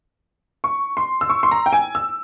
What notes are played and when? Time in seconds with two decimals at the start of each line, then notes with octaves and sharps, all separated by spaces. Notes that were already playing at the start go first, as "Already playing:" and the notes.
0.64 C#6
0.97 C6
1.21 E6
1.30 C#6
1.43 C6
1.51 A#5
1.66 G5
1.73 G#5
1.95 E6